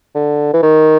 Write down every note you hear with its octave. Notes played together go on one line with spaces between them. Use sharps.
D3
E3
D#3